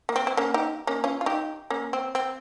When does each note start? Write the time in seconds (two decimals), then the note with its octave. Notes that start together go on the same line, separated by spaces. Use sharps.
0.09 A#3
0.16 C4
0.27 C4
0.37 A#3 C#4
0.54 D#4 G4
0.87 A#3 C#4
1.04 C#4 F4
1.21 F4
1.26 D#4 G4
1.70 A#3 C#4
1.93 C4
2.15 C4